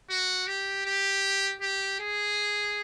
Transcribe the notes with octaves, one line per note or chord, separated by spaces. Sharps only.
F#4
G4
G4
G4
G#4